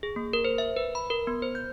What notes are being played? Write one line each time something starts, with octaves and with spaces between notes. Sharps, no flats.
G#4
A#3
A#4
C5
E5
B4
B5
A#4
B3
C5
G6